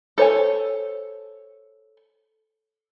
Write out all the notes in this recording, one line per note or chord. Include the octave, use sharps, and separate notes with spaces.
A4 C5 C#5 F#5 G#5